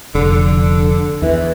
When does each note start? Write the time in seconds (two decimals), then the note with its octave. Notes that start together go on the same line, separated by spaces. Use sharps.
0.15 F1 D3
1.22 E2 E3